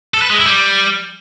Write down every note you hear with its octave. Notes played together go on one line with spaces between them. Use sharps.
A4
B4
G#3
E4
G3